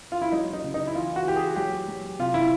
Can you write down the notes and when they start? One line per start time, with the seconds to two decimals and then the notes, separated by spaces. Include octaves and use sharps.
0.12 F4
0.22 E4
0.32 F#3 D#4
0.53 D#4
0.64 C#3
0.74 D#4
0.87 E4
0.95 E3 F4
1.16 F#4
1.25 E3 G4
1.36 G#4
1.56 F#3 G4
1.88 F#3
2.19 C3 F4
2.34 E4